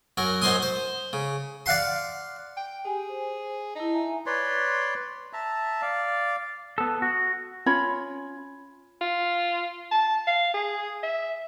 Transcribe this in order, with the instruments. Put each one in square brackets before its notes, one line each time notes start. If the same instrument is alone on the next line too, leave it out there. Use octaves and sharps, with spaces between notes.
[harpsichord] F#2 F#3 A#4
F#2 D#4 C5 G#5 C6 D#6
C5
C#3
D5 F5 F#5 C6
[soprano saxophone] G5
[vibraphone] G4 G#5 [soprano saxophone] G#4
[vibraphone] C5
[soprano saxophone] D#4 [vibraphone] E4 A5
[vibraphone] E5 G#5 A#5
[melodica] B4 C#5 D5 C6
E5 A5 A#5
D5 F5
[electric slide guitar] B3 A4
F#4
[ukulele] C#4 F4 C#5 B5
[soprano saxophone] F4
A5
F5
G#4
E5